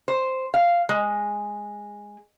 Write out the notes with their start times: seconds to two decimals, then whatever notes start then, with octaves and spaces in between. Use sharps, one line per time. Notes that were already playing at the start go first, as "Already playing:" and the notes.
0.08 C5
0.54 F5
0.89 G#3